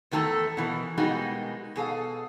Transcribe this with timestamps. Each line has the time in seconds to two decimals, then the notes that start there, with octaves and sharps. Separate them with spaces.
0.11 E2 D#3 A3 A4 A#5
0.57 B2 E3 A#3
0.97 B2 G3 G#3 A#3 D#4 F#4
1.76 B2 G#4 A4 F5